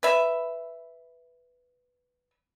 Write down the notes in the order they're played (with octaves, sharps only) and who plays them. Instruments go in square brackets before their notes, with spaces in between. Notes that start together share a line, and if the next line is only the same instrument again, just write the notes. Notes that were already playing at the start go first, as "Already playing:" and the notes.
[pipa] B4 E5